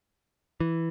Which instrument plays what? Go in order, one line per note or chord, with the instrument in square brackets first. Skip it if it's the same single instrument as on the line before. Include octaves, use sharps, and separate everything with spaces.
[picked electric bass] E3